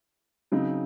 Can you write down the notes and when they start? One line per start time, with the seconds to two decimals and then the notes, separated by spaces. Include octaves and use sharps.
0.52 C#3 F#3 C4 D#4